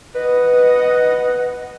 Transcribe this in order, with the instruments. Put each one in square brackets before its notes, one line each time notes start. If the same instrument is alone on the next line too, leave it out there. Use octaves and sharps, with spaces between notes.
[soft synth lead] B4 [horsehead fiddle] D#5 F#5